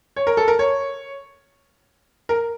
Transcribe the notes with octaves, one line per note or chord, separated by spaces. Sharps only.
C#5
A#4
A4
A#4
C#5
A#4